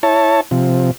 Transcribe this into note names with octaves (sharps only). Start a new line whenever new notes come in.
E4 C#5 A5
C3 F3